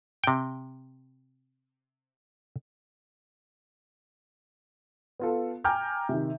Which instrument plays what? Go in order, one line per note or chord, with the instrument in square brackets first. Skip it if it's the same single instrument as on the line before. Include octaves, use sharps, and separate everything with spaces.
[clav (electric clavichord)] C3 G5
[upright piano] B3 F4 A4
G5 G#5 A#5 D6 F6 G6
C3 D#3